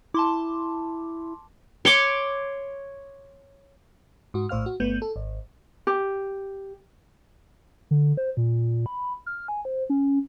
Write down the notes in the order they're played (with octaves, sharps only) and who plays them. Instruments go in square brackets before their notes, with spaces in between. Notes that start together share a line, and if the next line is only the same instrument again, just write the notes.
[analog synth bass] E4 [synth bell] A5 C6 D6
[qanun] C#5 C6 D6
[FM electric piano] G#2 F#4
A#1 A2 C5 F5 F6
F#4
G1 A3 B3 G6
A4
G#1
[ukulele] G4
[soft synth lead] D3
C5
A#2
B5
F6
G#5
C5
C#4